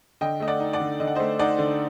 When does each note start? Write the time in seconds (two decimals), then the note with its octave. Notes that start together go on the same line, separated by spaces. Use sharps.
0.21 D3 D#5 G5
0.40 A3 D#5
0.48 D5 F#5
0.60 D#4
0.73 D5 F#5
0.80 D3
1.00 D3 D#5
1.07 F#5
1.15 A3 C5 D#5
1.39 D#4 D5 F#5
1.58 D3